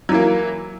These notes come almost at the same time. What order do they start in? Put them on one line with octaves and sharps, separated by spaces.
F#3 E3 A#3